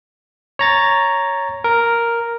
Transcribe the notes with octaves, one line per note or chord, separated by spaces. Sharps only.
C#5 A#5 A6
A#4